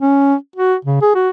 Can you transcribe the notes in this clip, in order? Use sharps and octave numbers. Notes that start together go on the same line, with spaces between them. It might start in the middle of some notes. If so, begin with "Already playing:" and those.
C#4
F#4
C#3
G#4
F#4